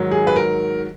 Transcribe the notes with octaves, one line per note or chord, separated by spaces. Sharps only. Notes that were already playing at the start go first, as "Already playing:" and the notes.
Already playing: G#2 D#3 F#3
G#4
B4
A#4